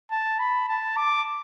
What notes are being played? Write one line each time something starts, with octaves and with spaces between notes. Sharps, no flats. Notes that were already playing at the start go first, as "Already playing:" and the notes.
A5
B5
A5
D6